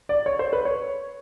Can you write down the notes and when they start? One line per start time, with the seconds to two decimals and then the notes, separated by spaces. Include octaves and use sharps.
0.09 D5
0.26 C#5
0.39 C5
0.53 B4
0.65 C#5